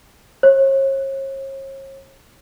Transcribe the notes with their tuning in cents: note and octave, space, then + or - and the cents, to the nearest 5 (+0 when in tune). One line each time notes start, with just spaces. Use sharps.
C#5 -40